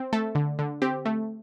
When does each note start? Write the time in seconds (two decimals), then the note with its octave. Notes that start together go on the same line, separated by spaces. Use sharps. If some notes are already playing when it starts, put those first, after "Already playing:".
Already playing: C4
0.13 A3 A4
0.35 D3
0.59 D3
0.82 C4 G4
1.05 A3